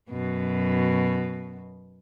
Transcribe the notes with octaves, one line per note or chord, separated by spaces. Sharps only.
F#2 B2